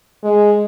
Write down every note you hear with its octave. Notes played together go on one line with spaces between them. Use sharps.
G#3